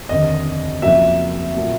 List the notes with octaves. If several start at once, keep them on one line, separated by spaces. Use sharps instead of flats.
F1 D#2 D3 D#5
F1 F2 C#3 F#3 A#3 E5
A#2 F#3 A3